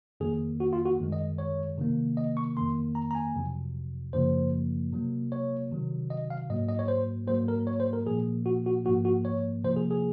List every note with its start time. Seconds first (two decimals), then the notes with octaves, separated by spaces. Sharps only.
0.20 F2 D#3 A#3 G#4
0.60 F#4
0.73 F4
0.86 F#4
1.00 F#2 D#3 G#3
1.12 D#5
1.38 C#5
1.78 C3 D#3 A#3
2.17 D#5
2.37 C#6
2.57 F2 D#3 A#3 C6
2.95 A#5
3.11 A#5
3.15 G#5
3.35 F2 C3 F#3
4.13 F#2 C#3 F3 A#3 C5
4.93 C3 F#3 A#3
5.32 C#5
5.71 C3 D#3 F#3
6.10 D#5
6.30 F5
6.49 G#2 F#3 A#3 D#5
6.69 D#5
6.79 C#5
6.88 C5
7.27 G#2 F#3 A#3 C5
7.48 A#4
7.67 C#5
7.80 C5
7.93 A#4
8.06 A#2 F3 A#3 G#4
8.46 F#4
8.66 F#4
8.85 G#2 F3 A#3 F#4
9.05 F#4
9.25 C#5
9.64 C3 F3 A#3 C5
9.76 G#4
9.91 G#4